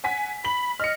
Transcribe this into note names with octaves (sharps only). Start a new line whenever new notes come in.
F#5 G#5 B6
B5 B6 F#7
D#5 F6 C#7